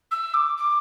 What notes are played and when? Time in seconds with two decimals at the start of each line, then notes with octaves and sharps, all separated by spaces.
0.11 E6
0.33 D6
0.57 D6